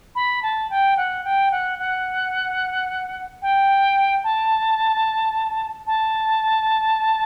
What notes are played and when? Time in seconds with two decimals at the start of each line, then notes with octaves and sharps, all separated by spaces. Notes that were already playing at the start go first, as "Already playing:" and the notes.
0.15 B5
0.42 A5
0.70 G5
0.97 F#5
1.24 G5
1.51 F#5
1.78 F#5
3.42 G5
4.24 A5
5.87 A5